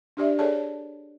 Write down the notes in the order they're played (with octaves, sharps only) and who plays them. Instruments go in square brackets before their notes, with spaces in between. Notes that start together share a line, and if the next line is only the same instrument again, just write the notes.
[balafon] D4 G4 D5 E5
G#4 A4 C#5 D5 A5